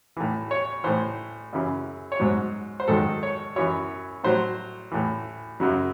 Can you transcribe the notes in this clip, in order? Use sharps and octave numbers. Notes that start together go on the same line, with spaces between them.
A2 E3
C#5
A2 E3 C5
F#2 C#3 E3
C#5
G#2 F#3 C5
C5
G#2 D#3 F#3 A4
C#5
F#2 E3 C#5
A2 F#3 C5
A2 E3
F#2 C#3 F#3